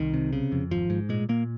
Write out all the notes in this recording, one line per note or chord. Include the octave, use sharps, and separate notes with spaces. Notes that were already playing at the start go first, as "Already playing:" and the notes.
Already playing: C2 D#3
C3
C#3
F2
G#1 F3
G#2
A#2 G#3
A#2 A#3